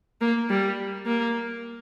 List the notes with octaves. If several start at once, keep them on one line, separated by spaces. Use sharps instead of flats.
A#3
G3
A#3